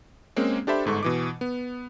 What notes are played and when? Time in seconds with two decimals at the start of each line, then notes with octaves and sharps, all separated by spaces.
0.36 G#3 A#3 C4 C#4 G#4
0.67 D4 G4 A4 C5 E5 B5
0.85 G1 G#2 A4 C#6
1.03 B2 E3 D6
1.41 B3